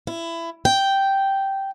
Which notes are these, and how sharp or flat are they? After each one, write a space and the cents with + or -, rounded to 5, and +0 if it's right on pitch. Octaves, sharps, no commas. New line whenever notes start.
E4 +20
G5 -5